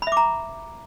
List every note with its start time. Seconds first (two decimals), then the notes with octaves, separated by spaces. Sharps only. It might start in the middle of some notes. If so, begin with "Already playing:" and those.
0.02 B5
0.07 E5
0.12 D6
0.17 A#5